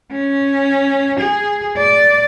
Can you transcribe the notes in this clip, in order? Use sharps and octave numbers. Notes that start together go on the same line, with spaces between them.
C#4
G#4
D5